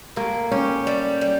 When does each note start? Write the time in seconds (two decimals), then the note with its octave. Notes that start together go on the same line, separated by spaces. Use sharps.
0.16 A2 A#3
0.51 C#4 G4
0.87 G3
1.21 G3